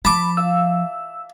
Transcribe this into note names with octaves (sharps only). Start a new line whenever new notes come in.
F3 A5 B5 D6
E5 F5 E6